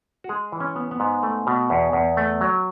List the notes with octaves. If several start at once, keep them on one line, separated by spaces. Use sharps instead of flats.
F#4
G#3 G#4
E3
C#4
B3
B3
G#2
A3
B2
E2
E2
A3
F#3